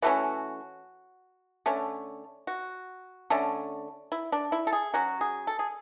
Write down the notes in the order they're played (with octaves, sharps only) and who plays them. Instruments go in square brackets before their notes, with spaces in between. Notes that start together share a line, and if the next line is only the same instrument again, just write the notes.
[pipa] E3 A3 C#4 F#4
D3 A3 C#4
F#4
D3 A3 C#4
E4
D4
E4
A4
G#4
F#3 C#4 F#4
G#4
A4
G#4